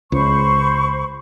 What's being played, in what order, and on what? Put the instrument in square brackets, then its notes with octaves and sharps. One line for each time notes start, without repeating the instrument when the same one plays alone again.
[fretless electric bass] C#2 [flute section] C5 B5 C#6